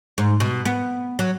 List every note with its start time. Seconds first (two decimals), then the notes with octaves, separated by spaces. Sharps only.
0.18 G#2
0.40 B2
0.65 B3
1.19 F#3